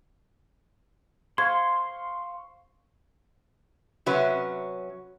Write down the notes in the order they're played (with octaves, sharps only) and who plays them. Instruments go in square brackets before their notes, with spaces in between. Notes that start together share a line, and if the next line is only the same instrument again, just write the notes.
[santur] C5 F5 C#6 [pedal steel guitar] C6 [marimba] G#6
[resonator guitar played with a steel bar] C3 F#3 C#4 B4